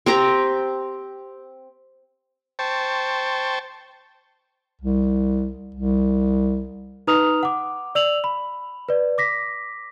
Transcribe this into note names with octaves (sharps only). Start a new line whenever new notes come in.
C4 G4 A#5
C5 G5 A5 C#6
C2
C2
D#4 B4 A#5 D#6 F6 F7
F#5 D6
D5 E6 F7 F#7
B5
B4 D5
D6 A#6 B6